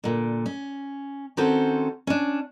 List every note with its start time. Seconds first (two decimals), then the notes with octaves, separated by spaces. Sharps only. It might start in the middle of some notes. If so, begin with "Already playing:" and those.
0.04 A#2 D3
0.46 C#4
1.37 D#3 C4 C#4 F#4 A4 C5
2.07 C#4 D4